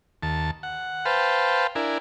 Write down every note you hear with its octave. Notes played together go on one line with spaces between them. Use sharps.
D#2 A5
F#5
B4 C5 F5 G5 A5
D4 E4 A#4 G#5